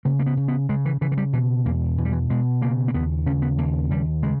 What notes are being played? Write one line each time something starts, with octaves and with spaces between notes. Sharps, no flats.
C#3 A#3
A#3
B3
C#3
B3
C#3 G#3
E3
C#3 E3
E3
G3
B2 E3
E2 A#3
B2 E3
G3
E3
B2 G#3
C#3 A#3
A#3
D#2 B3
C#3 C#4
B3
D#2 A#3
D#2 G3
C#3 G#3